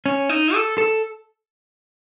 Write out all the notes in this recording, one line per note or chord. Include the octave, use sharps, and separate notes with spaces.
C#4
D#4
A4
A4